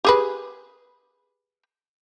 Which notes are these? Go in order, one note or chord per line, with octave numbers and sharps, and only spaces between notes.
G4 G#4 B4